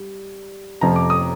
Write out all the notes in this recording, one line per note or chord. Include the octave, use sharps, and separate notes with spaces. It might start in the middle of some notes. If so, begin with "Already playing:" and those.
Already playing: G3
F2 C3 F3 A#5
D6
D#6